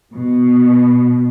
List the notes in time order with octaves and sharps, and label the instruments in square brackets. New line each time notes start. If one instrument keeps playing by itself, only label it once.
[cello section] B2